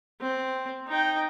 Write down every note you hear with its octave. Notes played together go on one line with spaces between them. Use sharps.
C4
D#4 G5